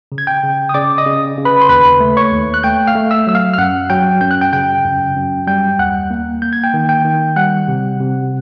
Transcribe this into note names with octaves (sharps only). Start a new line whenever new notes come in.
C#3
G#6
G5 G6
C#3
D#6
C#3 D5 D6
D#5 D#6
C#3
C#3
B4 B5
C6
D#2 B4 B5
A3
C#5 C#6
D#2
F#6
A3 G5 G6
F5 F6
A3
E5 E6
F#3 E6
F5 F6
F6
F#2 F#5 F#6
F#3 G5 G6
F#2 G6
F#6
G5 G6
C#3 G5 G6
F#2
F#2
G3 G5 G6
D#2 F#5 F#6
A#3
A#3 G6
G#6
G5 G6
D#3
G5 G6
D#3
G3 F#5 F#6
C3
C3